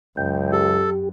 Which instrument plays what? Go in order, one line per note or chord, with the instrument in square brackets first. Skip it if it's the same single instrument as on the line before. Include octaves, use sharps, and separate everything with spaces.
[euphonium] C#2 [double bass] F#2 [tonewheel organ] G5
[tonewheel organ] G4 [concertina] A4